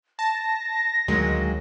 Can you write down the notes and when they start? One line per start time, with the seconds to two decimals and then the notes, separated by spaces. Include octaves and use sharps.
0.19 A5 A#6
1.08 D2 D#3 F#3 G#3 A#3